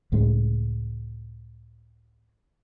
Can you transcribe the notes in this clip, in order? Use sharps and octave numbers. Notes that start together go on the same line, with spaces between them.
C#2 A2 C#3 G#3